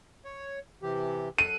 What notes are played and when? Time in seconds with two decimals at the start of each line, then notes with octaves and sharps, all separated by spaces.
0.25 C#5
0.82 C3 E3 G4
1.38 F#2 A4 F#6 D#7